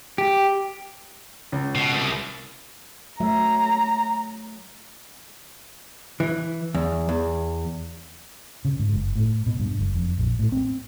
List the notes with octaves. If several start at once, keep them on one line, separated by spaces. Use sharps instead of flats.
G4
C#2
B2
C2
F#3 A3 E5 A#5
E3
E2
E2
C#3
G#2
F#1
A2
B2
G2
F#1
F2
A#1
A2
C4